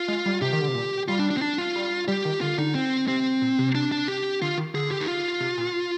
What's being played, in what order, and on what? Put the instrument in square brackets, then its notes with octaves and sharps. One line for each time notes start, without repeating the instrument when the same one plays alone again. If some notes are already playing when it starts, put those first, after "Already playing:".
Already playing: [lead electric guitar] F4
[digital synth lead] G#3
G3
[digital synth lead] C3 [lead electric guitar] G4
[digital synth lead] D#3
D3
C3
A#2
[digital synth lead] G3 [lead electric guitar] F4
[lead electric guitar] D4
D4
C4
D4
F4
[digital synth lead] G3
[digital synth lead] G3 [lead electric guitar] G4
[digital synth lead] D#3
[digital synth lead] D3 [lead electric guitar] F4
[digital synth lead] D3 [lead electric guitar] D#4
[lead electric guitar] C4
[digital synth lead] C3 [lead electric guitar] C4
[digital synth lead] A#2
C3
[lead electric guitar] D4
D4
G4
[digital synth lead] D3 [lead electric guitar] F4
[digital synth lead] D#3
[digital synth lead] D3 [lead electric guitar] G#4
[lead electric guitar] G4
D#4
F4
[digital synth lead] C3
A#2